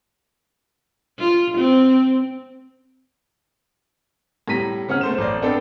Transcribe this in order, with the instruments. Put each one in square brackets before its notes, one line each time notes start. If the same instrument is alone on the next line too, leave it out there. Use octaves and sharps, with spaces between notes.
[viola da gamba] F4
C4
[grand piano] A2 G3 A#5 B6 D#7
C#3 C#4 F#5 F6
A3 C5 E7
A1 D5
B3 C4 D4 A4 G5